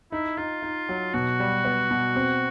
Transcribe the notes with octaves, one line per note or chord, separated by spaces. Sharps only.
D#4 E4
D#4 F4
D#4
F#3
B2 F#4
G3
B3
B2
C4